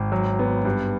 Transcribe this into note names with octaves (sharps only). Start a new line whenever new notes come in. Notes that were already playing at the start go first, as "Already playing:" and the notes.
Already playing: G#1
F#3
B3
G2